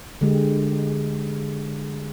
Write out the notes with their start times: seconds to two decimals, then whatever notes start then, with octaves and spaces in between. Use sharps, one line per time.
0.21 D3 G#3 G4